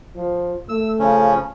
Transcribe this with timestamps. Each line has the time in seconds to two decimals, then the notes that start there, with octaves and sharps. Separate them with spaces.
0.16 F3
0.69 A3 E6
0.99 C#3 F3 C#4